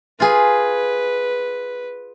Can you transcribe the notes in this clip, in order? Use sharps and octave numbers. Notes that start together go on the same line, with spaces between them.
F4 G#4 B4